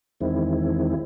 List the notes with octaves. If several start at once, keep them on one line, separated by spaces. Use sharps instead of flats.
E2 D#3 G#3 C4 E4